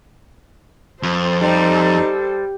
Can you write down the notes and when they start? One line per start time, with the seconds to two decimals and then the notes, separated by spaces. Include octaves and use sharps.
1.03 F2 A4 C5
1.41 G3 D#4